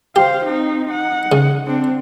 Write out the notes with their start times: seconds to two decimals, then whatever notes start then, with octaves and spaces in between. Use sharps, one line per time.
0.16 G4 C5 F5
0.46 C4 D#4
0.88 D#4 F#5
1.32 C#3
1.67 C4 D4